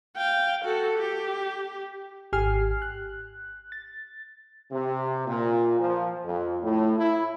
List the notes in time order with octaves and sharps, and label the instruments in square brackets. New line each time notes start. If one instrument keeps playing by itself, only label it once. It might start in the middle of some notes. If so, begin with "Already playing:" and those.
[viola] F5 G5
F#4 A4
G4
[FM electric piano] G#1 G4 G#5 F6 C7
F#6
A6
[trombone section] C3
A#2
F3
F2
A2
E4